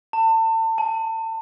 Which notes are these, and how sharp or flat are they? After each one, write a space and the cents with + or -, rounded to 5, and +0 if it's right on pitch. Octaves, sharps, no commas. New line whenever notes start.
A5 +35
A5 -40